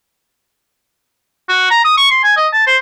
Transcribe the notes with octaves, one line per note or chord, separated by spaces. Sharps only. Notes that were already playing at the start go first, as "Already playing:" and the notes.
F#4
A#5
D#6
C#6
C6
G#5
D#5
A5
C5